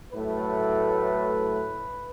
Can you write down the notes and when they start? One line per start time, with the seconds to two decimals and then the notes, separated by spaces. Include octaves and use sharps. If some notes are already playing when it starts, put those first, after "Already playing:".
0.12 A2 F#3 A3 B4